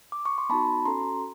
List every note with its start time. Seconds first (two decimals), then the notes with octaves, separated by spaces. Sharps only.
0.12 D6
0.25 C#6
0.38 C6
0.49 B3 D#4 F#4 A5 B5
0.85 C#4 F#4 A4 A#5 C6